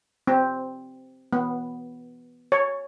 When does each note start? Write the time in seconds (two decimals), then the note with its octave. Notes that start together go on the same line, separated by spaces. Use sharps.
0.27 C4
1.33 B3
2.52 C#5